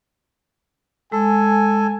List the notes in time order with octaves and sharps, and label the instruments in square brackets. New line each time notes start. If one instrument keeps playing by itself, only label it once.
[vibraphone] G#3 [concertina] A4 [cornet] G#5